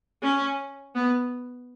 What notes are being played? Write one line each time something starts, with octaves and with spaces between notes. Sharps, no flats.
C#4
B3